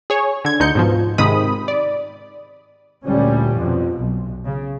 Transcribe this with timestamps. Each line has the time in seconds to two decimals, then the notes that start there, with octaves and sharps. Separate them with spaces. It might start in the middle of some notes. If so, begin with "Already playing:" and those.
0.10 G#4 C#5
0.45 D3 G#6
0.60 D2 D3 D#4 G6 C#7
0.75 G#2 B2 F3
1.18 G#2 C3 D#3 G#3 B5 D#6
1.68 D5
3.05 D2 A#2 G3 C#4
3.55 F2 B2
4.00 B1
4.45 C#3